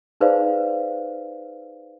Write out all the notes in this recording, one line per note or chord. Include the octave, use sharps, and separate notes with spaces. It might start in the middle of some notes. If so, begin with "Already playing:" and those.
D#4 G#4 B4 C5 D5 F5